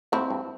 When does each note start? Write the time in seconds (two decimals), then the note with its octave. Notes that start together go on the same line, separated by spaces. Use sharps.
0.12 A2 C4 E4
0.30 G2